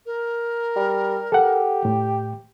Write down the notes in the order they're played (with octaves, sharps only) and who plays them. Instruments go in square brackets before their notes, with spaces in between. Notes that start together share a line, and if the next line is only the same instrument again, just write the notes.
[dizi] A#4
[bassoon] G3
[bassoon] G4 [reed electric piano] A4 F#5
[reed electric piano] A2